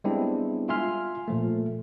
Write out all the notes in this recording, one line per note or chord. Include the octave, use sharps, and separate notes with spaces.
G3 G#3 B3 C4 D4 E4
F4 E5 G#5 C6 F6
A#2 F3 A3